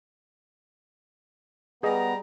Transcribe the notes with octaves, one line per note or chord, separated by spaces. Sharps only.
G3 B3 G#4 D#5 A#5